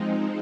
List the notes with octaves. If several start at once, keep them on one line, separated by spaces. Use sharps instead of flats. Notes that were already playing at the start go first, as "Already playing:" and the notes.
Already playing: F3 G#3 C4 D#4